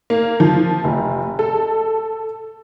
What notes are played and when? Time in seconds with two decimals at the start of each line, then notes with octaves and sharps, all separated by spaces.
0.10 A#3
0.40 F3
0.84 F1
1.39 A4